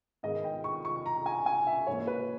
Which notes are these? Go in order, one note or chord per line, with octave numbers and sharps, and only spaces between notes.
G#2 D#3 G#3 B3 D#5
G5
C#6
C#6
A#5
G#5
G#5
E5
G#2 E3 A#3 C#5
B4